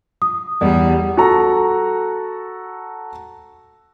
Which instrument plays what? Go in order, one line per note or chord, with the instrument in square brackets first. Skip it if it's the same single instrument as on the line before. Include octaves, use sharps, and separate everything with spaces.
[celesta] D#6
[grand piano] E2 [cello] G3
[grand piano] F#4 A4 A#5